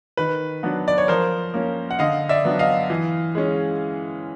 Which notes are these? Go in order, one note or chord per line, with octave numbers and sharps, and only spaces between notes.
D#3 B4
F#3 B3 D4
D5
C#5
F3 A#4 C5
A#3 C#4
F#5
D3 D#5 F5
D5 E5
F#3 B3 D4
D#5 F5
E3
G#3 C#4